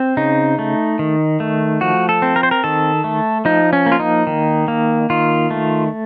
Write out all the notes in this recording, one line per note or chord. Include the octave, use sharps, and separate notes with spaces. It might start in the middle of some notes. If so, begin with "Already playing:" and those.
Already playing: C4
C#3 D#4
A3
D#3
A3
F3 F#4
A4
C4
A#4
C5
A#4
D#3 A4
A3
F3 D#4
C#4
A#3
F4
D#4
D#3
A#3
D#3 F4
A3